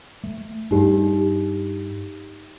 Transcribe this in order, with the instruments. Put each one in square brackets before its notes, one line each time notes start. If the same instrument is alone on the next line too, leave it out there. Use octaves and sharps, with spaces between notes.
[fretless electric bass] A3
[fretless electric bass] G2 [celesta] D#4 G4